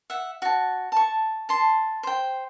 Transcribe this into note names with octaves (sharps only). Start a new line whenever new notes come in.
E5 F#5
F#4 A5
A5 C#6
A5 C6
C5 G5